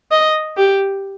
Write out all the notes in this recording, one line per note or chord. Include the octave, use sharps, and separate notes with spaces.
D#5
G4